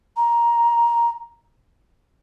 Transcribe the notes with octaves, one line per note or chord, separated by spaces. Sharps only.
A#5